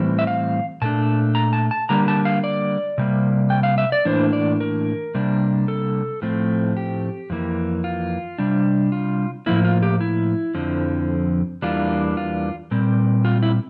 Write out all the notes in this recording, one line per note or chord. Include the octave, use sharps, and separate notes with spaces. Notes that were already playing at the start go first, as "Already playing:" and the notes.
Already playing: A2 E3 G3 C4
E5
F5
A#2 A3 D4 A5
A#5
A5
A5
D3 G3 A#3 A#5
A5
F5
D5
C3 G3 A#3
G5
F5
E5
D5
A2 E3 A#3 D4 C5
D5
A#4
C3 G3 A#3 D4
A4
A2 F3 A3 C4
G4
F2 E3 A#3
F4
C3 G3 D4
F4
A2 F3 A#3 E4
F4
G4
E4
F2 D3 F3 C4
E2 E3 G3 A#3 D4 F4
F4
A#2 G3 C4
F4
E4